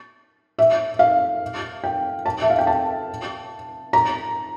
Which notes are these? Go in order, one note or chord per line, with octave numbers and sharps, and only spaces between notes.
E5
F5
G5
A5
E5
F5
G5
A5
A#5